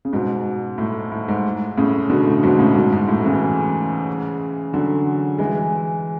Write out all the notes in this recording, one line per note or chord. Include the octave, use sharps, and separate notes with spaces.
C#3
G#2 B2
A2
A2
G#2
A2 C#3
B2 D3
A2
G#2 B2
A2 C#3
G#2 B2
G#2
A2
C#3 E3
D3 F#3
E3 G#3